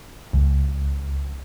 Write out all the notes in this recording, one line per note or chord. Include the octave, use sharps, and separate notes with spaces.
C#2